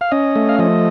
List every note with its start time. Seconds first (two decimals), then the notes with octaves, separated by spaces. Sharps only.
0.01 F5
0.12 C#4 D#5
0.36 A3
0.49 F5
0.59 F3 D#5